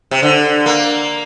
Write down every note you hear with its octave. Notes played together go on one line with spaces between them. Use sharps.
C3
D3
A#3